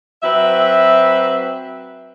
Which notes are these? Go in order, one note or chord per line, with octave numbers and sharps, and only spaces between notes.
F#3 C4 B4 E5